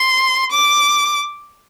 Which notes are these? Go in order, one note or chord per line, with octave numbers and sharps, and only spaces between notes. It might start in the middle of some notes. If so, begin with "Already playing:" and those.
Already playing: C6
D6